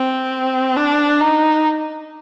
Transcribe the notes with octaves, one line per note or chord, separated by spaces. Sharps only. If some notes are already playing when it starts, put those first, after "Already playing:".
Already playing: C4
D4
D#4